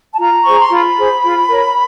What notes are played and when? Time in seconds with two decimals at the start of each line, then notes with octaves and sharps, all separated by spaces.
0.14 A5
0.19 F4 A#5
0.45 G#4 C5 C#6
0.59 C6
0.71 F4 B5
0.98 G#4 C5
1.24 F4
1.49 A#4 C#5